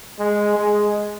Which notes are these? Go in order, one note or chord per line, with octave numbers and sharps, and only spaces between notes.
G#3
G#3